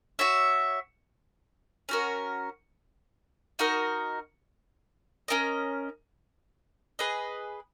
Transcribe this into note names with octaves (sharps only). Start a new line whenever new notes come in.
F#4 C#5 E5
C#4 F#4 A#4
D#4 F#4 A#4 D#5
C#4 E4 A#4 D#5
G#4 B4 D#5